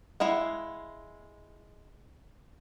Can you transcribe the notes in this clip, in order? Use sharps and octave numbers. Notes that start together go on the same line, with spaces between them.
G#3 E4 F5 F#5